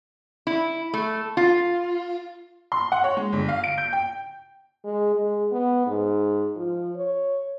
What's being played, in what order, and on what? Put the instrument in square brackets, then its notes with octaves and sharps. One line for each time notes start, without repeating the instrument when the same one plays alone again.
[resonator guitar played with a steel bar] E4
A3
F4
[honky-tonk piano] C6
F#5
C#5
G#3
G1
F5
D7
G6
G5
[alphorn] G#3
G#3
B3
G#2
F3
C#5